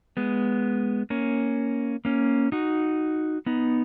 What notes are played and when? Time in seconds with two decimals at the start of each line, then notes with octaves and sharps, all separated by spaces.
0.17 G#3 B3
1.10 A#3 C#4
2.05 A#3 C#4
2.52 D#4 F#4
3.46 B3 D#4